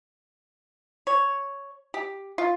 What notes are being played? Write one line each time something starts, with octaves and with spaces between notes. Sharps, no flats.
C#5
G4
F4